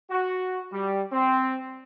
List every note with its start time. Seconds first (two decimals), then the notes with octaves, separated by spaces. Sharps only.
0.10 F#4
0.73 G3
1.12 C4